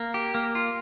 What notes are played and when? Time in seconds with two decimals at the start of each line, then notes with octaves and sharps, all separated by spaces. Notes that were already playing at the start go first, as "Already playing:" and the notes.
Already playing: A#3
0.14 G4
0.35 A#3
0.55 F4